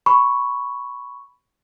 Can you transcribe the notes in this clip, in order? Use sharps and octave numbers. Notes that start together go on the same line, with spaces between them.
B5 C#6